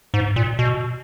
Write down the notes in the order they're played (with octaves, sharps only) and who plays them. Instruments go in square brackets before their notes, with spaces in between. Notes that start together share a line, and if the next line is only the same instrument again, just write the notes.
[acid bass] G#2
A#2
B2